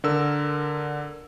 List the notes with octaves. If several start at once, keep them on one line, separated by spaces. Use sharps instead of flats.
D3 A#4 E6